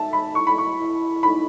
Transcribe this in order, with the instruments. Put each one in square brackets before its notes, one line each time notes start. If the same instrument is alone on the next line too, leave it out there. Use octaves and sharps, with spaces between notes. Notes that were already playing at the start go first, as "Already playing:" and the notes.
Already playing: [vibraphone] D#4 [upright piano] E5 A5
[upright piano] B5
[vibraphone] E4 [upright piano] C#6
[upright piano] B5
C#6
[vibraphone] E4
[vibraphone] D#4 [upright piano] B5